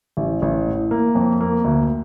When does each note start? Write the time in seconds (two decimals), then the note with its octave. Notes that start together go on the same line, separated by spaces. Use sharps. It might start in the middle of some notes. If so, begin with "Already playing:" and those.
0.17 A1
0.42 A1
0.66 A2
0.91 A#3
1.15 F2
1.41 A#3
1.64 D2